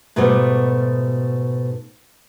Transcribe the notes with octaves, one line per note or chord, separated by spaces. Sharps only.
G#2 B2 G3 A3 B3 D5